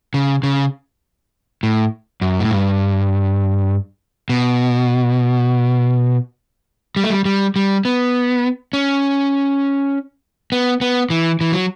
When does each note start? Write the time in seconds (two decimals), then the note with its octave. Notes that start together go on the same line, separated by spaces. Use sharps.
0.14 C#3
0.43 C#3
1.63 A2
2.21 F#2
2.40 A2
2.51 G2
4.29 B2
6.96 G3
7.04 A3
7.10 G3
7.25 G3
7.56 G3
7.85 B3
8.73 C#4
10.52 B3
10.81 B3
11.10 E3
11.41 E3
11.52 F#3